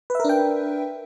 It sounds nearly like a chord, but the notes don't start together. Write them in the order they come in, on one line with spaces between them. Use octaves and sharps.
B4 E5 A#4 D4 G5